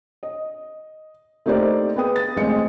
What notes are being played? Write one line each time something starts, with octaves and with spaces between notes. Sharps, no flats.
D#5
A3 A#3 D#4 G4 C5 D5
B3 G#4 G5 D#6
A6
A1 G#3 C4 D#5 C#7